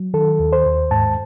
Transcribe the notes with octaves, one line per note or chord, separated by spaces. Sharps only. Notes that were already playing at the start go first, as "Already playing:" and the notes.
Already playing: F#3
D#3 A4
D#2
C5
D#2
G#2 A5